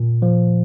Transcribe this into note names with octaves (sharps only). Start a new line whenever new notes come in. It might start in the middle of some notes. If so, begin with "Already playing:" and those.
Already playing: A#2
F3